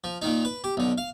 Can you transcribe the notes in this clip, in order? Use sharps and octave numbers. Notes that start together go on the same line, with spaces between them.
F3
A#2 D#3 D#4
B4
G4
B1 D3
F5